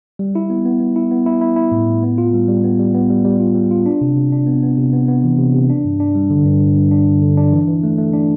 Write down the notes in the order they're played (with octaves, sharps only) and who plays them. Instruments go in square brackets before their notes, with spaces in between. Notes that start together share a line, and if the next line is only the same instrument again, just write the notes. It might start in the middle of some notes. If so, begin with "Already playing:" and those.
[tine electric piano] G3
E4
B3
B3
B3
E4
B3
E4
E4
E4
A2
A2
B3
F4
G3
G3
B3
G3
B3
G3
G3
F4
G3
F4
D4
C3
C3
D4
B3
B3
C3
B3
B3
E3
C3
C3
D4
G2
D4
G3
D3
G2
G2
G2
D4
D3
D3
D4
E3
E3
A3
A3
D4